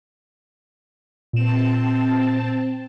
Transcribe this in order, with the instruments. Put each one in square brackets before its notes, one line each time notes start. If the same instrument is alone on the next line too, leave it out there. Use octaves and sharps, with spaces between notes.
[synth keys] A#2 E7 [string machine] C4 A5